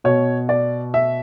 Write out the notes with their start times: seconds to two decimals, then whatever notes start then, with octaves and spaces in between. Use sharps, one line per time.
0.04 B2 C#5
0.49 D5
0.94 E5